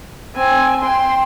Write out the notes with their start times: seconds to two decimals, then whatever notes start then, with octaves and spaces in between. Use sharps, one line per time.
0.35 C4 G#5
0.81 G5 C6